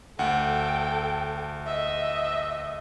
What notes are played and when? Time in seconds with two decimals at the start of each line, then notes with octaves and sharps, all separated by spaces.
0.19 D2 A4 F#5 G5
1.66 D#5 E5